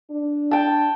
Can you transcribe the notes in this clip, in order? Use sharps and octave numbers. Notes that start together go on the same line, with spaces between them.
D4
G5 A5